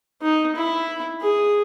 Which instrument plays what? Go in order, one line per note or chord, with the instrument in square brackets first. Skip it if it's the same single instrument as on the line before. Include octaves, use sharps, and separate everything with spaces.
[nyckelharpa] D#4
E4
G#4